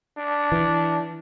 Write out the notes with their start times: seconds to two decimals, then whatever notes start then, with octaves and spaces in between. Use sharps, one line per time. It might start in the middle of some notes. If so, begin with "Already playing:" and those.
0.17 D4
0.52 E3